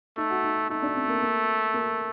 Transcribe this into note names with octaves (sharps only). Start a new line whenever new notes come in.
A3 D#4
F#4
D#4
A3 D#4
D4
C4
A#3
A#3
A#3